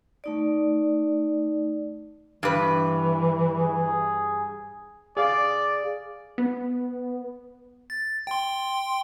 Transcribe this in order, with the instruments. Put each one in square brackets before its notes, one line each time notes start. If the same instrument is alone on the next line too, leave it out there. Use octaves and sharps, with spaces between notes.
[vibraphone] A3 D#4 D5
[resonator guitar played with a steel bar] G2 B4 [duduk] E3
[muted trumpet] G#4
[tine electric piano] G#4 F5 [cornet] D5
[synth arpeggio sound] B3
[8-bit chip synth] A6
G5 C6